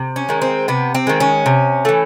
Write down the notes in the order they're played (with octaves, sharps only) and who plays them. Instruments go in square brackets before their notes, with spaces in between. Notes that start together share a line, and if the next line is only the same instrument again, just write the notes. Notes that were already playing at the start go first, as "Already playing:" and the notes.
Already playing: [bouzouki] C3
C#4
D#3 G#3
C4
C3 B3
C4
D#3 G#3
C#4
C3
E3 A3